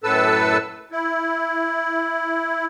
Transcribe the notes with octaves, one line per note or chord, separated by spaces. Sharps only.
F#2 A2 A4 B4 A5 E6
E4